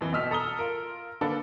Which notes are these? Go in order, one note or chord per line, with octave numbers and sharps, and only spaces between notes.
F2 E3
G1 B2 D#5 E6 F6 B6
A4 A#5 D#6 G7
F4 A#4
D3 A#3 D4 A4 B4